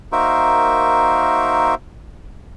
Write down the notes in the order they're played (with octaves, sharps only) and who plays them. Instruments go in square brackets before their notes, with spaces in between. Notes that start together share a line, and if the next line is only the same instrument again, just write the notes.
[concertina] A#3 D#4 F#4 A#4 C5 E5